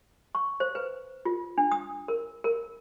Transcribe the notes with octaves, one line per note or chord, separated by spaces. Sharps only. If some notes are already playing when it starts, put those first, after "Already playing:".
C#6
C5
B4
F4
D4
D#6
A#4
A#4